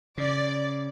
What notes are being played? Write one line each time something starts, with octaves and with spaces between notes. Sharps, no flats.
C#3 D5